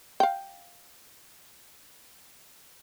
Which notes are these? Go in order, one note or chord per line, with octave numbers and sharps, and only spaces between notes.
F5 G5